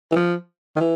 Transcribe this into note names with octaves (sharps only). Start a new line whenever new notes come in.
E3
F3
D#3
E3